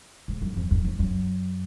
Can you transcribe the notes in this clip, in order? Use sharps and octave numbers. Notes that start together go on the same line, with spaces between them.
G#2
F#2
F2
F2
F2
F#2